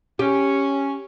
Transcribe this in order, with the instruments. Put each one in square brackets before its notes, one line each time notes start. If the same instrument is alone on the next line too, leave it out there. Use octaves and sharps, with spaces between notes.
[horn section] C#4 [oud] G4